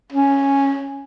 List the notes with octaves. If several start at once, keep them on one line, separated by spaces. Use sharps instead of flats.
C#4